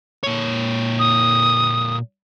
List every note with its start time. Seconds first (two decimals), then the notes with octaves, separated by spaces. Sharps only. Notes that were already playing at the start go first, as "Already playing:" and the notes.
0.23 A#2 C#5
0.99 D#6